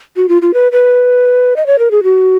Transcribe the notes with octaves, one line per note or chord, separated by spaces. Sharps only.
F#4
F4
F4
B4
B4
D#5
C#5
A#4
G#4
F#4